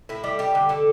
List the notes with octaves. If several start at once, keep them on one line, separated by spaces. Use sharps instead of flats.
A2 E4
G3
G3 G4
D3
D3 A4